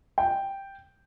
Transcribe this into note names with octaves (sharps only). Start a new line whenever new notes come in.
G5